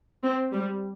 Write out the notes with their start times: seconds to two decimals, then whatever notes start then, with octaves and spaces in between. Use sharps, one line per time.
0.23 C4
0.53 G3